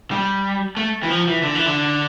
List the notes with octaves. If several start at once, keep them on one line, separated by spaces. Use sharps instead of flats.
G3
A3
E3
F3
E3
D3
E3
D3